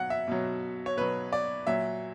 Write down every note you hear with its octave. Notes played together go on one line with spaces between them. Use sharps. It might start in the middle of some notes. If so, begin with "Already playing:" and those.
Already playing: B2 F#3 F#5
E5
B2 F#3
C#5
B2 F#3 B4
D5
A#2 F#3 E5